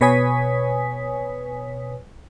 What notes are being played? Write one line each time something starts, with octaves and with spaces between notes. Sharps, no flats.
B2 B4 C#5 G#5 D#6 B6